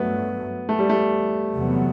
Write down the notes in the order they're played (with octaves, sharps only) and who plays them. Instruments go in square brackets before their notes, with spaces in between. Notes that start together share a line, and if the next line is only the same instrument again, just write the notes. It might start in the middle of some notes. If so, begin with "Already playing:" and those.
Already playing: [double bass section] G2 F#3 A3 [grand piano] B3
[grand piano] A3
G3
A3
[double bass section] E2 C3 F#3 B3